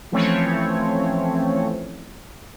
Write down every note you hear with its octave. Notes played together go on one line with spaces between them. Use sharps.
E3 F3 A3 C4 C#4 C#5